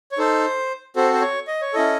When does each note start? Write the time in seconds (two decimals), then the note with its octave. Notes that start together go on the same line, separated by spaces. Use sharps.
0.12 C#5
0.18 D#4 A4 C5
0.96 C4 F#4 A4 C5
1.14 C5
1.21 C#5
1.48 D#5
1.62 C#5
1.73 C#4 E4 A4 D#5